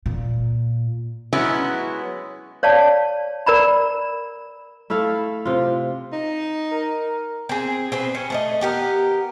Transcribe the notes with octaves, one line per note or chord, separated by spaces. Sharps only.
A#2
F#3 G#3 B3 C#4 E4 F#4
C#5 D5 F5 A5
A#4 D5 A#5 B5
A3 E4 A4 F5
C3 F4
D#4
A#4
C4 G#4
C4 G#4 B4
C#4
A3 C5 D#5
B3 G4 A#4